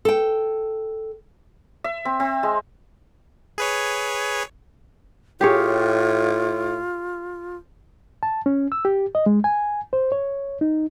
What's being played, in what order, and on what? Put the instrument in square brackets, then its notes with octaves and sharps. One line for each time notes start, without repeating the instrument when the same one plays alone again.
[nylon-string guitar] A4 G5
[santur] E5
C4
C4
G#3
[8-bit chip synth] G#4 B4 C#5
[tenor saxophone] A2 [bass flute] F4 [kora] G4 G#4 C#5
[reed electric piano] A5
C#4
E6
G4
D#5
G#3
G#5
C5
C#5
D#4